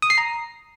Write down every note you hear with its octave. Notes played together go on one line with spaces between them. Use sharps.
D#6
C7
A#5